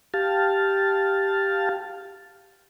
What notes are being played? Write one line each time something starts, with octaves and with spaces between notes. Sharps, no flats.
G4 F5 A5